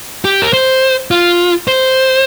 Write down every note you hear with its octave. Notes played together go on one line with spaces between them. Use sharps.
G4
A#4
C5
F4
C5